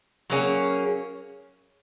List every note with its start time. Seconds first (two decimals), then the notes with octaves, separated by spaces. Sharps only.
0.30 F#3 A#3 C#4 G#4